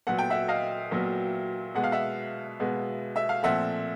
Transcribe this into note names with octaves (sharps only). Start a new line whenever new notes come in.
A#2 F#3 B3 F#5
G5
E5 F#5
D#5 F5
A#2 F#3 B3
B2 G#3 B3 F#5
F5
E5 F#5
B2 G#3 B3
E5
F5
A#2 F3 A3 C4 E5 F#5